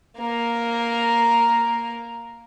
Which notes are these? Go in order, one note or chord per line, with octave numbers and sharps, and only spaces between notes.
A#3 A#4